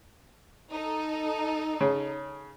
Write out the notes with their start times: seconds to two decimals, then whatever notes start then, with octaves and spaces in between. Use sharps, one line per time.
0.72 D#4 A4
1.81 C#3